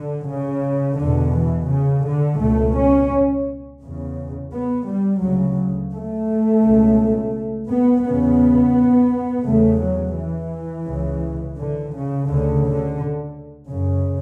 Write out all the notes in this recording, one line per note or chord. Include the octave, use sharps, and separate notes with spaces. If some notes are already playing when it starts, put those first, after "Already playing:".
Already playing: D3
C#3
E2 B2 D3
E3
C#3
D3
C#2 B2 A3
C#4
E2 C#3
B3
G3
D2 C#3 F#3
A3
C#2 B2
B3
E2 C#3 B3
E2 C#3 A3
F#3
E3
C#2 C#3
D3
C#3
D2 D3
C#3
D3
F#2 C#3